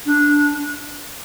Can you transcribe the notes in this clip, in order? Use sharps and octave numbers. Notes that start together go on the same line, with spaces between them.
D4